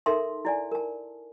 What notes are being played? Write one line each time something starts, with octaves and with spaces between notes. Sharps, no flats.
D#4 A4 A#4 E5 A5 C6
E4 D5 G#5
A#4 A5